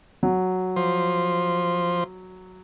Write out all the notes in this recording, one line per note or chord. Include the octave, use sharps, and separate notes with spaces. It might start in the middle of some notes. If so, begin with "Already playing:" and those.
F#3
F3 C5